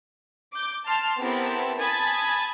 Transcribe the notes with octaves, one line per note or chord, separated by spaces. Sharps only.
D6 G6
A5 C6 F6
B3 C4 E4 G4 A4 A#4
G#5 A5 B5 D#6 G#6 A6